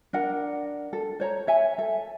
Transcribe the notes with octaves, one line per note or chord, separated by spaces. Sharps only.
D4 A#4 F#5
A4
C5 C#5 A#5
C#5 E5 G#5
A4 E5